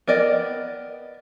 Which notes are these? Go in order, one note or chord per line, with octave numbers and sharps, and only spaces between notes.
B3 A#4 D5 D#5 G5